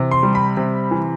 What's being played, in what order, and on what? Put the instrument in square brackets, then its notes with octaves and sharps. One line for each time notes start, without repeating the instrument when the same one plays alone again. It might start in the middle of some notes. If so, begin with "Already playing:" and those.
Already playing: [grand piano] C3 E3
C6
G3
B5
C3
E3